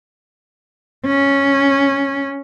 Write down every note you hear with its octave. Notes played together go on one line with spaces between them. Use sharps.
C#4